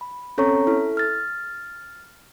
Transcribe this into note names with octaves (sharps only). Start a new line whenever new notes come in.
B5
C4 C#4 A4 C#5 A#5 C#6
E4 A4
F6 A6